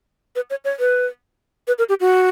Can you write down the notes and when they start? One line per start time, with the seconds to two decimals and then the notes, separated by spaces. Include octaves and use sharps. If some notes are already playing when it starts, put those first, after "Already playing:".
0.36 B4
0.50 C#5
0.65 C#5
0.80 B4
1.68 B4
1.78 A#4
1.89 G4
2.00 F#4